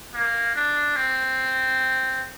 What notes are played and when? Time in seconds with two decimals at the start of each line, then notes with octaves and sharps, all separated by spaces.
0.14 A#3
0.55 D4
0.96 C4